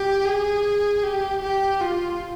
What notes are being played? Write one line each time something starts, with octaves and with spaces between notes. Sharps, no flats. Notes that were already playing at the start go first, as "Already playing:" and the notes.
Already playing: G4
G#4
G4
G4
F4